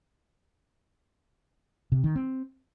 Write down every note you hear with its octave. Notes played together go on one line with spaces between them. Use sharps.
C3
D#3
C4